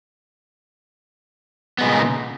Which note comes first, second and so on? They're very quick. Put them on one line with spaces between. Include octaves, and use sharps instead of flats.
B3 G#3 A#2 C#3 D#4